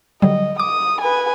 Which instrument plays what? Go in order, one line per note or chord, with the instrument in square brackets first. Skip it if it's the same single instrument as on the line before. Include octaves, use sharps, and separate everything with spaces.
[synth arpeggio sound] D3 F#3 G3 [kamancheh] D#5
[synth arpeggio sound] D6 [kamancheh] D#6
[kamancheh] B4 G#5